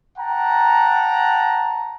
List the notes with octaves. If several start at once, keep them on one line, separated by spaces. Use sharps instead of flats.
F#5 G5 A5 A#5